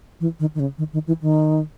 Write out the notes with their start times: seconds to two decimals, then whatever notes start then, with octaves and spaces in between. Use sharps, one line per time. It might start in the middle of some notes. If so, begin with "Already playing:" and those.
0.20 E3
0.40 D#3
0.55 D#3
0.60 C#3
0.78 D#3
0.93 D#3
1.07 E3
1.22 D#3